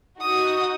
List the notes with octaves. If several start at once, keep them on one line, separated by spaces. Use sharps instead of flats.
D#4 F#4 D#6